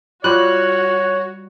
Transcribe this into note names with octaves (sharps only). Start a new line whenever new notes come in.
G3 F4 F#4 C#5 F#6